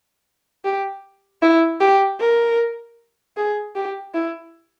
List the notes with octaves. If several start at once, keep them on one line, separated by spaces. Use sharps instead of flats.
G4
E4
G4
A#4
G#4
G4
E4